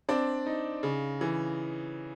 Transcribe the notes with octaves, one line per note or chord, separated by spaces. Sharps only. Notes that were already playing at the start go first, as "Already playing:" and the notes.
C4 D4 D5
D#4
C#3
E3